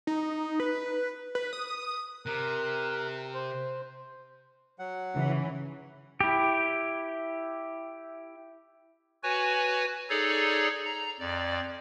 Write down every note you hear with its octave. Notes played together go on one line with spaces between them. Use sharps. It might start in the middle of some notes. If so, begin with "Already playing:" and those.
D#4
B4
B4
D#6
C3 A#4 F#6
C5
F#3 F#5
C#3 E3 C#4
E4 G4
F#4 B4 C#5 G#5
D#4 G#4 A4 C#5 D5
A#5
F2 D5